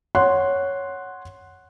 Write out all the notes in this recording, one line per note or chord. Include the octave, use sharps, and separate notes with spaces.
C#5 F#5 C6 F#6